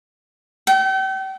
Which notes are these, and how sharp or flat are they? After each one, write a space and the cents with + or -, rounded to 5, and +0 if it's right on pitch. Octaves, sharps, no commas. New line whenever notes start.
G5 -35